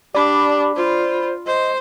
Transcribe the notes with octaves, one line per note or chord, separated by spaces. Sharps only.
D4 G4 D5 B5
F4 C5
C5 D#5